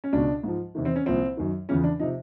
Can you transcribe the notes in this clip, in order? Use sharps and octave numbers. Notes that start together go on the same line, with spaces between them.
C#4
C#2 B2 D4
G#2 F3
E2 C3 D#3
C4
C#4
C2 A#2 F3 C4
F#2 D#3
E2 C#3 F3 C#4
D4
C3 F3 D#4